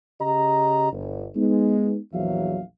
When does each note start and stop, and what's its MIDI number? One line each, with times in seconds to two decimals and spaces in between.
0.21 0.92 49
0.21 0.92 67
0.21 0.92 75
0.21 0.92 82
0.92 1.27 31
1.36 1.97 56
1.36 1.97 59
1.36 1.97 63
2.13 2.61 34
2.13 2.61 40
2.13 2.61 52
2.13 2.61 54
2.13 2.61 76
2.13 2.61 77